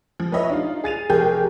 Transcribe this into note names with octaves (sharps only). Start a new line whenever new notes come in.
F3
B4 C#5 D#5 E5
D4 D#4 F4
G#4 A6 D#7 F7
F1 G4 G#4 A#4 G6